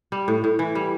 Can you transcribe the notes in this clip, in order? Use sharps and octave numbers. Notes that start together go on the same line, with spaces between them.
G3
A2
A2
E3
G3